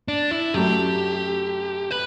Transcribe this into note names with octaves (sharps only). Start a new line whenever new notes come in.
D4
E4
F#2 F#3 A3 G4
B4